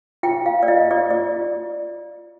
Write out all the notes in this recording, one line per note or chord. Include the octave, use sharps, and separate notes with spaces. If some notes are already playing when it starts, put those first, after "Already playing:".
F4 G5
F4 F5
D5
F4 D#5
F4 D5
F4 D5
F4